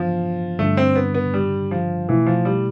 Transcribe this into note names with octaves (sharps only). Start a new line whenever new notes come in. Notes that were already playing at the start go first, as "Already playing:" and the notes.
Already playing: G2 E3 F3 B3 D4 F4
G2 D3 G3 A3 D4
C4
B3
B3
G3
F3
B2 E3 A3 E4
F3
G3